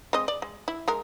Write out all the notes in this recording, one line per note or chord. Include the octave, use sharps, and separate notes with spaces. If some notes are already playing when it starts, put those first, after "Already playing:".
G#3 C4 D#5
D5
G#3
E4
G#3 A#4